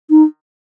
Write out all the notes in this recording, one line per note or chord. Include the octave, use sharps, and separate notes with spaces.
D#4